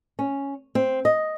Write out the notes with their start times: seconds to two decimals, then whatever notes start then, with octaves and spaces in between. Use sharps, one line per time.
0.19 C#4
0.75 C4
1.05 D#5